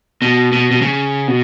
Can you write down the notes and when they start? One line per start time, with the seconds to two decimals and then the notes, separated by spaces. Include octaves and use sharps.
0.22 B2
0.52 B2
0.71 B2
0.82 C#3
1.28 B2